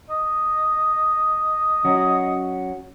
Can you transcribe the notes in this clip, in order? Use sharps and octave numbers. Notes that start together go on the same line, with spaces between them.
D#5
F#3 C#4 F#4